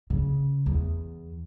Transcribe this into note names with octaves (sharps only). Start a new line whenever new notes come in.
C#3
E2